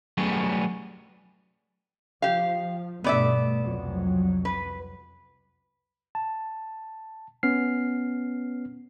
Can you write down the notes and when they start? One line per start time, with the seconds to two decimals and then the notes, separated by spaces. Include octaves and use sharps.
0.17 F#3 G3 A3 B3 C#4 G#4
2.22 F3 G4 F5
3.04 G2 B2 A3 B3 D5 E5
3.63 C2 F2 F#3
4.45 B4
6.15 A5
7.43 B3 C#4 F6 C7